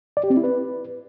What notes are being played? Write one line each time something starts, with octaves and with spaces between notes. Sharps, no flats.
D5
G4
C4
E4
B4